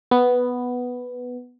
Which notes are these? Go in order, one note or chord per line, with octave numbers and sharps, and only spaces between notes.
B3